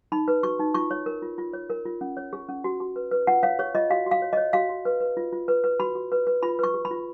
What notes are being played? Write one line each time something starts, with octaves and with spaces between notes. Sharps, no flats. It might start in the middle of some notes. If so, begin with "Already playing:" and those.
D#4 B5
B4
F#4 C#6
D#4
F4 C#6
C#5
A#4
F4
F4
C#5
A#4
F4
C#4
C#5
G#4
C#4
F#4
F#4
B4
B4
F4 F#5
C#5 F5
G#4 C#5
F4 D#5
F#4 F5
F#4
F5
C#5
C#5 D#5
F#4 F5
F#4
B4
B4
F4
F4
B4
B4
F#4 B5
F#4
B4
B4
F4 B5
B4 C#6
G#4
B5
F4